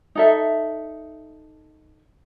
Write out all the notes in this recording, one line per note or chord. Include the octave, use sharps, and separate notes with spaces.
D#4 A4 E5